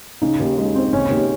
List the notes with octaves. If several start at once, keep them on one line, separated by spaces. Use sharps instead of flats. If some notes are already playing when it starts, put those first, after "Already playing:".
C#3 D#4
D#2
G#3
C4
C#3 C#4
D#2